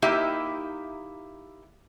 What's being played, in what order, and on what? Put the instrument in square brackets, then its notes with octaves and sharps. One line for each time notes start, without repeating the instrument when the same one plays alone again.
[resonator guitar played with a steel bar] A#3 D#4 E4 G4 E5